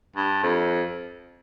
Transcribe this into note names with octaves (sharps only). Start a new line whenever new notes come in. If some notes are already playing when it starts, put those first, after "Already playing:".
G2
F2